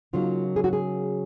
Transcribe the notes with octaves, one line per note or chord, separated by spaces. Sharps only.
C#3 F#3 A#3 D#4 F4
G#4
F#4
G#4